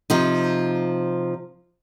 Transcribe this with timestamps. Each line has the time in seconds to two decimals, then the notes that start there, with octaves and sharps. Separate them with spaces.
0.10 C3 F3 D#4